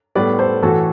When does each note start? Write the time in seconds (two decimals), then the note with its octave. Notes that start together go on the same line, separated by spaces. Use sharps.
0.15 A2 G3 B3 B4 D5
0.39 A4 C5
0.62 A2 E3 A3 F#4 A4